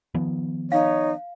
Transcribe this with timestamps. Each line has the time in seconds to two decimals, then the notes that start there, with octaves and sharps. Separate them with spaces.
0.14 D#3 F3 B3
0.72 D#4 C#5 F5